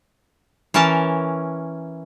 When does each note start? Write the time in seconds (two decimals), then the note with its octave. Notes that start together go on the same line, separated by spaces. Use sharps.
0.74 E3 C#4 A#4 A5